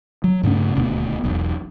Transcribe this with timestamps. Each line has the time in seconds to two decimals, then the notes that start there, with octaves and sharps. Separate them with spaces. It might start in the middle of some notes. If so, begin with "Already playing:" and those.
0.24 F#3
0.43 G2 C#3 A3 C#4
0.75 D#1 D2 B2 B3
1.24 E1 B1